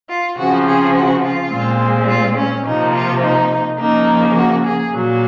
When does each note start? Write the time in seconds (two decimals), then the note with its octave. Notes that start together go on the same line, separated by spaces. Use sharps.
0.09 F4
0.37 C#3 F3 C4 F#4
0.66 G#4
0.95 F#4
1.23 F4
1.52 A#2 G#3 C4
2.08 F4
2.36 C#4
2.65 C3 F3 A#3 D#4
2.93 F4
3.21 D#4
3.78 C#3 F3 A#3 D#4
4.35 F#4
4.64 G#4
4.92 A#2 F#3 A#3